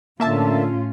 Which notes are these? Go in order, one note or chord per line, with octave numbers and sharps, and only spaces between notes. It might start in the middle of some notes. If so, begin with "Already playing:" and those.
A2 D3 A3 A#3 C#4 F4 E5 A5